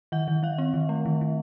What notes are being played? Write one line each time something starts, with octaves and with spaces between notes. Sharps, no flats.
D#3 F#5
D#3
D#3 F5
C4
D#3
A3
D#3
D#3